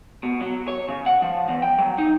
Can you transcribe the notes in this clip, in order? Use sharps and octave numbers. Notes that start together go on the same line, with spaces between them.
B2
F#3
C#5
C#3
F#5
F3
E2
G5
F#3
D#4